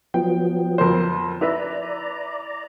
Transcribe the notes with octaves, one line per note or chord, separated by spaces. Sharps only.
F3 F#3 B3 G5
F2 A#4 C5
E4 B4 D5 E5 A#5